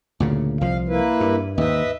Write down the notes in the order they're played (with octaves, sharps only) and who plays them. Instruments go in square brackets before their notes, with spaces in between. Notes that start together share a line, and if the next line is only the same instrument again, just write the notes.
[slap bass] D2 A#2 C#3
[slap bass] C2 F3 [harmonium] F5
[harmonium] A#3 E4 B4
[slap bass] G2
[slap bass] D#2 G#2 [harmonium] B4 D#5 E5